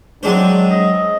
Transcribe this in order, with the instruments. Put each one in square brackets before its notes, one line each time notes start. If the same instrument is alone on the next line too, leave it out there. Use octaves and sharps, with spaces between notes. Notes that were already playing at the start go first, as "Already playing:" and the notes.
[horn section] D#3 C4 D4 [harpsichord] F#3 G#3 C5
[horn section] C4 D#5